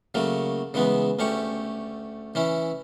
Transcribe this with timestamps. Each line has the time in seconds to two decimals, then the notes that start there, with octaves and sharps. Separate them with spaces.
0.15 C#3 F#3 A3 A#3
0.74 C#3 E3 G#3 B3
1.19 D2 A3 C#4 G4 C#6
2.35 E3 C#4 E4